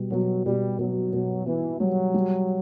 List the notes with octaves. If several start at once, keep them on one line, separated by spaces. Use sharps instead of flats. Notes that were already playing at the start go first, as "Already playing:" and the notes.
Already playing: B2 G3
B2 F#3
B2 G3
B2 F#3
B2
E3 B3
F#3 G3
G3